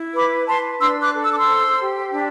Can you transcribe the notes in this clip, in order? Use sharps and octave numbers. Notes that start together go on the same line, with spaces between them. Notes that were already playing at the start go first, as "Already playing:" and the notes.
Already playing: E4
B4 B5 D6
B4 A5 C6
D4 C6 E6
D6 F#6
A4
E6
D6
C6 E6
C5
G4
D4